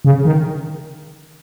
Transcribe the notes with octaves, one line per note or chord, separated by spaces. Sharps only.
C#3
D#3